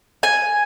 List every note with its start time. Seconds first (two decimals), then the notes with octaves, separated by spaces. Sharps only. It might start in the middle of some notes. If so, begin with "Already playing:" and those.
0.23 G#5